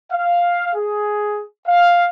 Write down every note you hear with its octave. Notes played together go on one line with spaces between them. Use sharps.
F5
G#4
F5